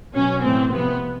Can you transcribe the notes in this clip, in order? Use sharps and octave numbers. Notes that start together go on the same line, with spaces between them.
B2 F#3 C#4
A2 E3 C4
C3 F3 B3